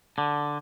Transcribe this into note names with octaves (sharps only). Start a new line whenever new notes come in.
D3